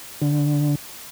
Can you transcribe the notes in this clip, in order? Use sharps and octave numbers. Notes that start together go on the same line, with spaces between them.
D3